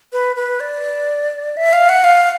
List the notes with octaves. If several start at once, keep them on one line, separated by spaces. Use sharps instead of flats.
B4
B4
D5
E5
F5
F#5
F5